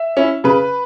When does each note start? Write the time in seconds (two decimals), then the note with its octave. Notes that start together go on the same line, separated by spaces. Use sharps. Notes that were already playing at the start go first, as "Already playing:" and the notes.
Already playing: E5
0.17 C#4 E4
0.44 C#3 B4